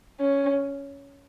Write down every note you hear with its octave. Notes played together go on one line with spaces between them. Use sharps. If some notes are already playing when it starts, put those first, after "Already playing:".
C#4